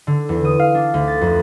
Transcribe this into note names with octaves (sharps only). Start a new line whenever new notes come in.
D3
E2
D#6
F5
D4
D2
A6
F2